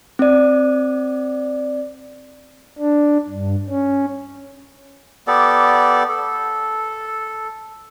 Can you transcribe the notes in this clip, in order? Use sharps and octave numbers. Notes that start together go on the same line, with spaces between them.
C4 D5
D4
G2
C#4
B3 G4 A4 D5
A4